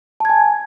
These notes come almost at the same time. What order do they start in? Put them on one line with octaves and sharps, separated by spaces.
A5 G#6 G#5